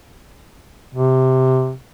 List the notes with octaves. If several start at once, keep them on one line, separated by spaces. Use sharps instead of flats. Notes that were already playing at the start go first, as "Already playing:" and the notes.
C3